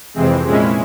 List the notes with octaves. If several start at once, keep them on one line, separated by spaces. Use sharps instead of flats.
F2 C3 E3 G#3 C4
A#2 G#3 C#4 E4